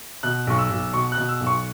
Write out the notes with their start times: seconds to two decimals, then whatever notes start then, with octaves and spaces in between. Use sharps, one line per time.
0.23 B2 F#6
0.47 B1 C#6
0.58 E6
0.70 B1
0.93 B2 C#6
1.12 F#6
1.17 B2
1.29 E6
1.41 B1
1.47 C#6